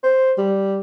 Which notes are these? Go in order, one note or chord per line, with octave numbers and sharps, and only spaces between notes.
C5
G3